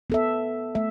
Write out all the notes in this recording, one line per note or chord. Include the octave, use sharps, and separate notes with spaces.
B3 A4 E5
A3 E5